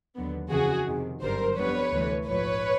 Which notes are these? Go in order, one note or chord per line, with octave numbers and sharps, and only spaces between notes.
D#2 D3 F#3 B3
F2 C#3 E3 F#4 G#4
F2 C3 D#3
G1 F#2 D3 G3 A#4 C5
F2 D3 G3 B3 B4 C#5
D2 C3 E3 A3
A#1 G#2 F3 B4 C#5